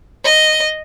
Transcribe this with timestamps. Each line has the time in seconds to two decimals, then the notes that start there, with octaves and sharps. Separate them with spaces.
0.25 D#5